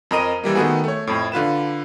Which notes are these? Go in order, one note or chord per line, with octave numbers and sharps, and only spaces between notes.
F2 A#4 D#5 D#7
E3 G3 A#3
D#3 A3 B3 F#4 G#4
A3 C#5
F2 A2
D3 F4 B4 E7